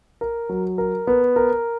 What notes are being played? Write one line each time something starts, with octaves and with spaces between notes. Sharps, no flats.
A#4
F#3
A#4
B3
A#4